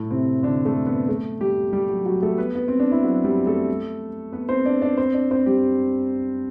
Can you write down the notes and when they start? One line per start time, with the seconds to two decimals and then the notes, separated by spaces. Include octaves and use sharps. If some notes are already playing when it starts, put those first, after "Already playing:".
Already playing: A2 A3
0.11 C3 C4
0.43 D3 D4
0.65 A3 A4
0.86 B3 B4
1.08 A3 A4
1.41 G3 G4
1.73 G3 G4
1.89 F#3 F#4
2.05 F#3 F#4
2.22 A3 A4
2.38 B3 B4
2.55 B3
2.68 C4
2.80 D4
2.92 E4
3.03 F#3 F#4
3.24 G3 G4
3.46 A3 A4
4.32 B3 B4
4.49 C4 C5
4.65 D4 D5
4.81 D4 D5
4.97 C4 C5
5.14 D4 D5
5.31 C4 C5
5.46 G3 G4